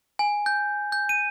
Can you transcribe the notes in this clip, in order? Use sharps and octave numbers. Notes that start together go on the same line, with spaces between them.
G#5
G6
G6
D#7